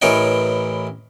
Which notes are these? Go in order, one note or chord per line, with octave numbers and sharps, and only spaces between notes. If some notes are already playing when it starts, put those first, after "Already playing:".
A1 E3 A#4 C#5 D#5 G5